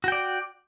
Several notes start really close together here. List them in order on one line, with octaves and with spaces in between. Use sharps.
F#4 G5 D5